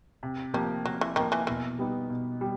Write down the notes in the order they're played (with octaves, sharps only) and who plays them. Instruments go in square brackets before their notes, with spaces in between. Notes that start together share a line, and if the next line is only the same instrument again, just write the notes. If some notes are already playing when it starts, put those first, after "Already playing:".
[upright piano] C3
[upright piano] F3 A#3 [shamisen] G3
[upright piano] C3 [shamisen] F#3
[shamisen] E3
[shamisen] D#3 [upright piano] F3 A#3
[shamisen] E3
[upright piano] B2 [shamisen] E3
[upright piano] G3 B3 D#4
B2
G3